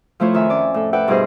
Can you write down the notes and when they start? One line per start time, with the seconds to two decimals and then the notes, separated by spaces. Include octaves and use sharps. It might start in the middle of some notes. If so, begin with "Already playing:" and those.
0.20 F3 A3 E4 F4 C#5
0.33 F2 D#3 E5 G#5
0.50 C#4 D5
0.74 A2 A4
0.93 A4 B4 D5 E5 F#5 G5
1.08 G2 B2 E4 G#4 C5 D#5